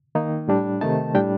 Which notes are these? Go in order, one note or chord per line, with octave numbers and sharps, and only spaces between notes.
D#3 A#3 D#4
A2 G3 D4
C3 D#3 A3 D#4 A5
A2 G3 D4 G5